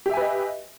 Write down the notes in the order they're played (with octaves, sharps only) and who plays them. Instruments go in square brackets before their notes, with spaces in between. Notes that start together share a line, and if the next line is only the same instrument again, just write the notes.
[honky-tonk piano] G4
E5
G#5
B4
D#5